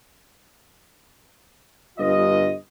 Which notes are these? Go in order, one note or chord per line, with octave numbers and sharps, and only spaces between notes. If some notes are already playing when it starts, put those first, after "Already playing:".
G1 G2 F4 D#5